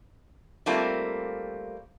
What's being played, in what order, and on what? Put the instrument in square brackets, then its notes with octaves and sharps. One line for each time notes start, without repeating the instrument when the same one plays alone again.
[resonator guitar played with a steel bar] G3 A3 A#3 C4 F4